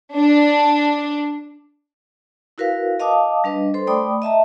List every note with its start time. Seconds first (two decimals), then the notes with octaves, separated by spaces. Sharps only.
0.15 D4
2.58 E4 F#4 A#4 B4 F5
3.00 D#5 F5 A5 D6 D#6
3.44 G3 D4 B4 D#5
3.74 A4 C5 C6
3.87 A3 D5 G5 B5 D6 D#6
4.22 D#5 E5 A5 A#5